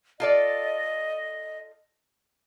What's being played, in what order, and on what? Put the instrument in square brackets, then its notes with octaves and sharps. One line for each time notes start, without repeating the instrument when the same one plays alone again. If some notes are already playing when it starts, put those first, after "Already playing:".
[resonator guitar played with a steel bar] F4 A4 D5 [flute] D#5